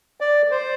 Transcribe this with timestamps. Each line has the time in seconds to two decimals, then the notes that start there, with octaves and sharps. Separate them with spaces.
0.21 D5
0.51 C5